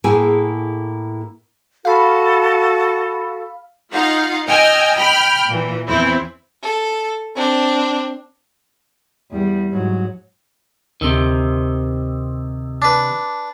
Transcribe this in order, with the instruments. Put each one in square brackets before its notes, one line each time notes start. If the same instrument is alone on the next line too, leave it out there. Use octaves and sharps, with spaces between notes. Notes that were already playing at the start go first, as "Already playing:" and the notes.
[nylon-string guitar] A2 A#3 E4 G#4 G5 G#5
[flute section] F#4 A4 [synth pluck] F5 B5
[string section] D#4 F4 F5 F#5
D#5 G5 G#5 E6 F6
G5 B5 F6
A#2 E3
E2 E3 C4 E4
[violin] A4
C4 D4
[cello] E2 G3
G#2 F#3
[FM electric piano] D2 E6 [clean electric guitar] C3 D#3
[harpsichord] D4 B4